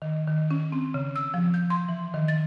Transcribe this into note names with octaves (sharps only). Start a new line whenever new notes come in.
D#3
D#3
C#4
C4
C#3
E6
F3
G6
C6
E3
D#3
A6